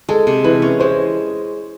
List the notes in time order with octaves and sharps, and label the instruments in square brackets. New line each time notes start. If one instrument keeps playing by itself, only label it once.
[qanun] G#3 [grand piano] A4
[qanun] C3
[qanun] E3 [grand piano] B4
[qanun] C#4
[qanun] G#3 [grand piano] C5